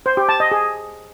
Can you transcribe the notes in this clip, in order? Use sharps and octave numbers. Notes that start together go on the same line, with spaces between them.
C5
G4
A5
D#5
G#4